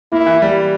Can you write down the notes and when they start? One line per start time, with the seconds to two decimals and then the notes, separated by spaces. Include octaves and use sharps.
0.12 A#3 E4
0.26 E3
0.42 G3